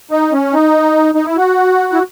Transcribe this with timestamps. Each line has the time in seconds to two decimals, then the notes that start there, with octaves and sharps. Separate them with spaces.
0.11 D#4
0.33 C#4
0.53 D#4
1.15 D#4
1.26 E4
1.37 F#4
1.93 E4